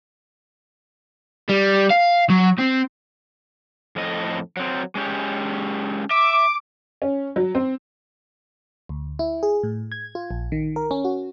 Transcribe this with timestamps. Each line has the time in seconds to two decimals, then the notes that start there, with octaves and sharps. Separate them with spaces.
1.49 G3
1.90 F5
2.30 F#3
2.58 C4
3.96 F2 A2 D#5
4.57 F#3 C4
4.95 G#3 C#4 G4
6.10 E5 D6
7.02 C#4
7.36 F#3
7.55 C4
8.89 D2
9.19 E4
9.43 G#4
9.63 A2
9.92 G#6
10.15 F4
10.31 A#1
10.52 D#3
10.76 A#4
10.91 C#4
11.05 F#4